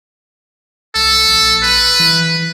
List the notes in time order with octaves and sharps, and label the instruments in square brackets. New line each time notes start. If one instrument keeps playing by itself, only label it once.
[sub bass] C2 [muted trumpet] A4
[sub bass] A#1
[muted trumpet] B4
[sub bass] E3